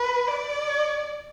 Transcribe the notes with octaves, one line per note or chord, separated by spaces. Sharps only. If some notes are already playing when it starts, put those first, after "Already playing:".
Already playing: B4
D5